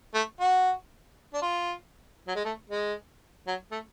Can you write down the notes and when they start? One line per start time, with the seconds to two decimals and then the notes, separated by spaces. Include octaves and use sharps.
0.14 A3
0.40 F#4
1.33 D4
1.42 F4
2.27 F#3
2.35 G#3
2.45 A3
2.70 G#3
3.47 F#3
3.71 A3